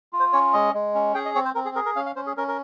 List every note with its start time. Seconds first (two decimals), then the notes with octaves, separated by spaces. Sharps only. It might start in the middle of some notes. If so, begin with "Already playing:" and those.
0.13 F4
0.20 C5
0.33 C#4 C#5
0.53 G#3 D#5
0.74 G#3
0.95 C#4
1.14 G#4 G5
1.25 D#5
1.35 C4 C#5
1.45 C5
1.55 C4 A#4
1.65 G#4
1.75 G#4 A#4
1.86 A#4
1.96 C#4 F5
2.06 F5
2.16 C#4 C5
2.27 G#4
2.37 C#4 A#4
2.48 A#4